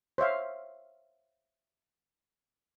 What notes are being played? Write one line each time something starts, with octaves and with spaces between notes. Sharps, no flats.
C5 C#5 E5 F5